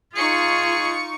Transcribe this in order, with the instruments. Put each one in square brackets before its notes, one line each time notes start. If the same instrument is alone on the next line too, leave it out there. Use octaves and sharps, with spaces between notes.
[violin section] D#4 C#6 C#7 [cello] F4 [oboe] G#4